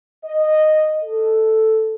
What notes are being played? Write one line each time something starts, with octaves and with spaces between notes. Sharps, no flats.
D#5
A4